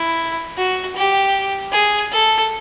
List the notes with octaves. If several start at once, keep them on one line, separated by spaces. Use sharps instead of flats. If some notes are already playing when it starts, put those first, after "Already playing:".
Already playing: E4
F#4
G4
G#4
A4